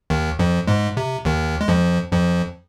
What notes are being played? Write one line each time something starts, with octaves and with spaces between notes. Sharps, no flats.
D#2 D#3
F2 F3
G#2 G#3
C3
D#2 D#3
G#3
F2 F3
F2 F3